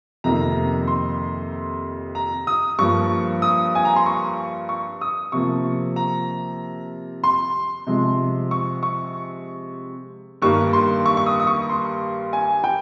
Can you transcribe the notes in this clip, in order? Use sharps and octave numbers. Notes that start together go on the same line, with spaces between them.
F2 C3 D#3 A#3 A#5
C6
A#5
D#6
G2 F3 A#3 C#6
D#6
G#5
A#5
C6
C#6
C#6
D#6
C3 F3 A#3 C#6
A#5
C6
C3 F3 G#3
C#6
C#6
G2 D#3 G3 A#3 C#6
C6
C#6
C#6
D#6
D#6
C#6
C6
G#5
G5